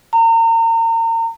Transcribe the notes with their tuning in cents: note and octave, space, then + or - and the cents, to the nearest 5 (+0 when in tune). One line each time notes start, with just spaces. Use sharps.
A#5 -35